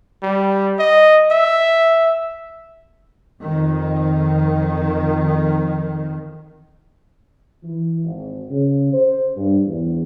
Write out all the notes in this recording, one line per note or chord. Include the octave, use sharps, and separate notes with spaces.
G3
D#5
E5
F2 D#3
E3
G#1
C#3
C5
G2
E2